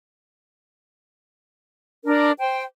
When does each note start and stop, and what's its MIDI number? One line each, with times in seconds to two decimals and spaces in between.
2.05 2.31 62
2.05 2.31 70
2.39 2.63 72
2.39 2.63 79